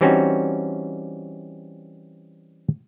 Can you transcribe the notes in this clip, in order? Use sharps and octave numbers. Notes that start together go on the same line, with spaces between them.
E3 G3 C4 C#4 D#4 F#4